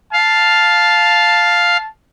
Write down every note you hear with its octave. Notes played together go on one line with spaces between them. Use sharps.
F5 A5